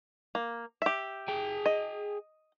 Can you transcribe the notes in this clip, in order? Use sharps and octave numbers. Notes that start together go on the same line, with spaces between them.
A#3
G4 E5
G#4 G5
D#5